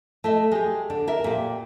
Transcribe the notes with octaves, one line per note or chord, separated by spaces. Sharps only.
A3 D#5 E5
G#3 G4
D3 D4
A#4 E5
A#2 G4